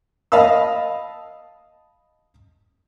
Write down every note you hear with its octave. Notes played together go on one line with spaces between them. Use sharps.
D#5 F5 A5 B5 E6